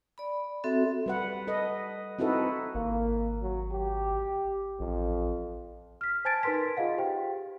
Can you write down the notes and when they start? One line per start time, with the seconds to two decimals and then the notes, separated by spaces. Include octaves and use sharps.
0.18 D5 B5
0.64 C4 F#4 A4 E5
1.06 G3 B4 F#5
1.47 A4 B4 D#5
2.19 C4 D#4 E4 F#4 A4 B4
2.74 G#1 A#3
3.42 F#3
3.72 G4
4.79 A1 F2
6.01 F6 B6
6.25 C5 G#5 A5 G#6 A6 D7
6.43 D#4 A#4 B4 C6 B6
6.77 F4 G#4 D#5 F5 F#5
6.98 G4 C5 G5